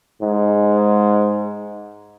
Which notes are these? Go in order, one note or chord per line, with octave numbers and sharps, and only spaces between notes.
G#2